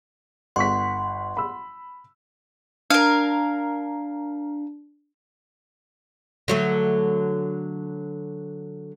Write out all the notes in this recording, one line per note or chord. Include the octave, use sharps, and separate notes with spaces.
G1 F#5 C6 C#6 B6
B5 E6
D4 A#4 F5
D3 F#3 A3